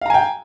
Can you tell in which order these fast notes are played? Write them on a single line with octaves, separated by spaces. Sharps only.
F5 A#5 G#5 G5